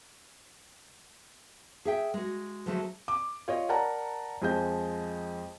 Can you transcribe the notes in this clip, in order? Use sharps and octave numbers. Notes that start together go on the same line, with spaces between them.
G#4 E5 G5
G#3 F#4
D3 F3 F#3 G#3 A3
D6
F4 C#5 D#5
A#4 D5 F#5 A5 A#5
F2 F3 G#3 D#5 G6